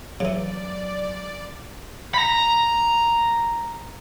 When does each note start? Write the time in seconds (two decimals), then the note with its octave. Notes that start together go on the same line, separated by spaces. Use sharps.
0.20 C#3 E3 F#3 D5
2.14 A#5 B5